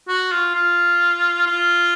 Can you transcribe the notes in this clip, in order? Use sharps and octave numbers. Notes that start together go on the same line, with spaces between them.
F#4
F4
F4
F4